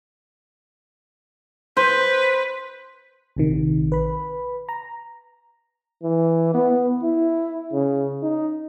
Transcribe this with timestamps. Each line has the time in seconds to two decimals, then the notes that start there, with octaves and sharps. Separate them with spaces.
1.77 B4 C5
3.36 A#1 C3 D#3
3.92 B4 B5
4.69 A#5
6.03 E3
6.54 B3
7.03 E4
7.73 C#3
8.23 D#4